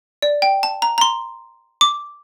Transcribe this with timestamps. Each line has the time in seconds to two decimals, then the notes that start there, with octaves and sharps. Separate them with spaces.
0.22 D5
0.42 G5
0.63 A5
0.82 A#5
0.98 A#5
1.01 C6
1.81 D6